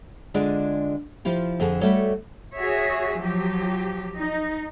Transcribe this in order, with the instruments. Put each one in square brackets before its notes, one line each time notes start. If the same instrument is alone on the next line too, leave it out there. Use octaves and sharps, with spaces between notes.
[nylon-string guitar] D3 G#3 D4 F4 G#4 D5
F3 E4 F4 G4
F2 D3 G#4 A5
G3 A3 F#4 A4 C#5
[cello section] F#4 G#4 C#5 E5
F3 F#3 G4
D#4